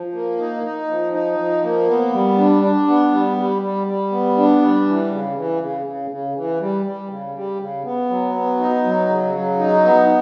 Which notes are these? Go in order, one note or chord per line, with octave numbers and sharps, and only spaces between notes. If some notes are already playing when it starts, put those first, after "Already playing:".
Already playing: F3
A#3
D#4
D#4
F3
D#4
F3
A#3
B3
G3
D4
D4
B3
G3
G3
G3
G3
B3
D4
G3
E3
C#3
E3
C#3
C#3
C#3
E3
G3
G3
C#3
G3
C#3
B3
F#3
B3
D#4
F#3
C#3
F#3
D#4
B3